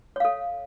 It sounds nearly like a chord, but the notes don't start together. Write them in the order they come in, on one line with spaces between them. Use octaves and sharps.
C#5 F5 A4